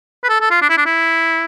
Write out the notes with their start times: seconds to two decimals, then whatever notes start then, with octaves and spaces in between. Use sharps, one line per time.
0.24 B4
0.29 A4
0.41 A4
0.51 F4
0.62 D4
0.69 E4
0.77 D4
0.86 E4